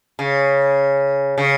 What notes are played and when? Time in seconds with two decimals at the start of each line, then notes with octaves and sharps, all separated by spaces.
0.19 C#3
1.38 C#3